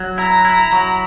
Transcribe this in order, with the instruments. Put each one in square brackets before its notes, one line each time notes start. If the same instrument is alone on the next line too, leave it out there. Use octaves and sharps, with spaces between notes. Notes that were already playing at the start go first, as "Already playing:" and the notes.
Already playing: [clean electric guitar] F#3
[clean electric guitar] E4 [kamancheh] A#5
[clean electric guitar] E4
F#3